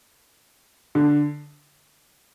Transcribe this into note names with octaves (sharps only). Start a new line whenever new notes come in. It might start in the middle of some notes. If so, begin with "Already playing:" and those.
D3